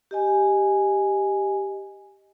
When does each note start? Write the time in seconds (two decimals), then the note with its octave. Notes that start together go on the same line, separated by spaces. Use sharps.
0.11 G4 D#5 G#5